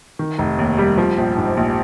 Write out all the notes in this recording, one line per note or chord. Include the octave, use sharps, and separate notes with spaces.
D#3
F1
D#2
G3
F3
A#1
G#2
A#1